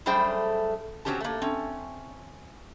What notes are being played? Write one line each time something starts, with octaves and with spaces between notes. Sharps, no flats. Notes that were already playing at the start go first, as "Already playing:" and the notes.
F#2 G3 A3 G#4 C5 G5
F#3 A#3 C4 C#4 G4 A5
A3 A#3
C4 C#4